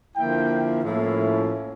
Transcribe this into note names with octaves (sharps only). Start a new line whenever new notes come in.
D3 F3 A#3 E4 G5
A2 F3 A#3 C#4 E4